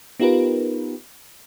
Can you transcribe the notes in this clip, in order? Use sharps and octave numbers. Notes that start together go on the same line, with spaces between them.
B3 D#4 F4 G4 A#4 B4